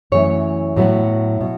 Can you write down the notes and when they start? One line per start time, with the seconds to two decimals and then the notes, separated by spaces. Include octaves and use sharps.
0.12 F#2 E3 A3 C#5
0.76 A2 F#3 B3
1.41 B2